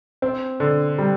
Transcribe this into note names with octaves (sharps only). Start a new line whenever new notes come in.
C4
D3
G3